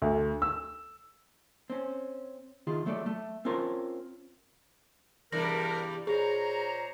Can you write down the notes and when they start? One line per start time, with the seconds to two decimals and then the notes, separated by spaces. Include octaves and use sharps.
0.02 D2
0.42 E6
1.70 C4 C#4
2.67 D#3 F4 G#4
2.86 F#3 A3 A4 D5
3.06 A3
3.45 C4 C#4 F4 A#4 C5 C#5
5.32 E2 G2 C3 G3 A#4 A#6
6.07 A#2 G#4 C5 C#5 A#5